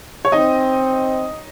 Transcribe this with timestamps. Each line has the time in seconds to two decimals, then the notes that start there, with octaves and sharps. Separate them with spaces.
0.25 C#5
0.32 C4 D#4 D#5